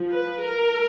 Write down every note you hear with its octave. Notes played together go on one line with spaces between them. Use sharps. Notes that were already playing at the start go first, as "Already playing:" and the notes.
Already playing: F3
B4
A#4